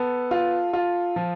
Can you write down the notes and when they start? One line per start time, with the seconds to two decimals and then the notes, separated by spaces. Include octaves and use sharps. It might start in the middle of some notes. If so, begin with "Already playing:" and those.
Already playing: B3 A4
0.31 F4
0.73 F4
1.16 F3